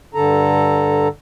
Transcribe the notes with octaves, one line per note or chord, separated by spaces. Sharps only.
G2 D3 A4 A#5